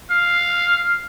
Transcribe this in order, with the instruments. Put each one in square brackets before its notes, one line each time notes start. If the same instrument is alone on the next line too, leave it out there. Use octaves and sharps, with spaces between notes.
[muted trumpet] F5